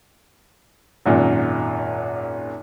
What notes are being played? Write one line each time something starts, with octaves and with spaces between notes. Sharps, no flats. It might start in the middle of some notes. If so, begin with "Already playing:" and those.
G#1 F#2 A#2